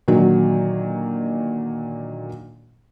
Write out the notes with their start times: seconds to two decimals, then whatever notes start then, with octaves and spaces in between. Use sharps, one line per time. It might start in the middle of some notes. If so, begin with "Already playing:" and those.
0.08 A#2 D3 D#3 F#3